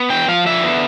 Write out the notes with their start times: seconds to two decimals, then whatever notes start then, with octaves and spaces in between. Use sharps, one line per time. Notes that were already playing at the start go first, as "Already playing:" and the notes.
Already playing: B3
0.10 E2 G5
0.28 F3 F5
0.46 D3 E5
0.64 B3